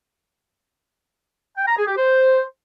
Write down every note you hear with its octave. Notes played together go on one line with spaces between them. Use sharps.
G5
A#5
G#4
G4
C5